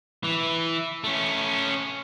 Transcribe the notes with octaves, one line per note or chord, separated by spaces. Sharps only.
E3
A3 C#4